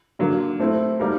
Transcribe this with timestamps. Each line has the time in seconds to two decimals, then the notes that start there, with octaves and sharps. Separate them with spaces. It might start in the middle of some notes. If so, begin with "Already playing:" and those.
0.19 D3 F#3 A#3
0.60 A3 C4 E4
0.99 G3 A#3 D#4 F#4 A#4